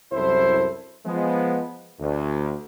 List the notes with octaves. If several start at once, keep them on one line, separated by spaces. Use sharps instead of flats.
C2 F#2 E4 A4 C5
F3 G#3 B3
D2